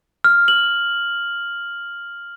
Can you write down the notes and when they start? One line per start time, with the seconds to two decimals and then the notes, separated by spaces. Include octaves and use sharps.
0.24 F6
0.48 F#7